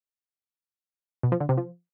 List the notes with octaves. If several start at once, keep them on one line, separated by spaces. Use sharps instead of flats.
B2
F3
D3
C3
F3